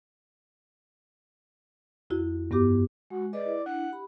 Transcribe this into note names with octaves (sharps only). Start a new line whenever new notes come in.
F2 E4 F#4
G2 B3 F#4 G4 D6
G#3 F#4
G#4 B4 D5 D#5
E4
D4 E4 F#5
G4 B5